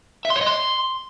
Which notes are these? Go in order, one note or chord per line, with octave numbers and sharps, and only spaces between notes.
E5
C6
C#5
D#5
C6